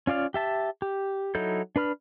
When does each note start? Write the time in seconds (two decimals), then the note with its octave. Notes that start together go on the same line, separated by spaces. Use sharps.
0.07 C#4 F4 D5 F5
0.34 G4 E5 A5
0.82 G4
1.35 F#3 D#4 E4 A4 G6
1.76 D4 B4 B5 F6